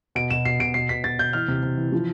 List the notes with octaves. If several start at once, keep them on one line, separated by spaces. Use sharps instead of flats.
B2 D7
B2 E7
B2 C7
B2 D7
B2 C7
B2 B6
B2 A6
B2 G6
E3 F6
C3
C3
E3
F3